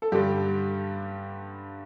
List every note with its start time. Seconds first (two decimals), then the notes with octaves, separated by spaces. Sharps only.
0.02 A4
0.12 G2 D3 G3 G4